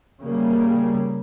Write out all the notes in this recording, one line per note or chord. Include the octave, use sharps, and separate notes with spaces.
C#3 G3 A#3